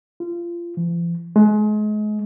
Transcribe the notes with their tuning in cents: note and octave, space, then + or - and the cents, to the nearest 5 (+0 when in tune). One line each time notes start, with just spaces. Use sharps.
F4 -25
F3 -45
G#3 +35